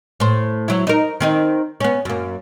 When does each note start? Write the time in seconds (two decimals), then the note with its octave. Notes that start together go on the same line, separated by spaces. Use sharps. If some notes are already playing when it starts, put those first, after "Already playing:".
0.20 A2 C5
0.68 F#3 E4
0.87 D#4 A#4
1.20 D#3 C4 D#4
1.80 B3 C#4
2.05 F#2 A#3